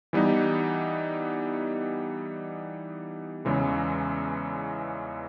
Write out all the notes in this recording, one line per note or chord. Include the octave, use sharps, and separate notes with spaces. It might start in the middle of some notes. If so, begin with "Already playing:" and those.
E3 G3 B3 D#4
E2 C#3 E3 G#3